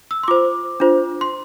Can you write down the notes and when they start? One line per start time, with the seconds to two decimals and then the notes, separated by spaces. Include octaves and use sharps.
0.11 E6
0.23 C6
0.28 F4 C5 D6
0.80 D4 F4 C5
1.21 C6